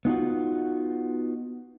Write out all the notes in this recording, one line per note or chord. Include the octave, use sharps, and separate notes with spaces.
B3 D#4 F4 F#4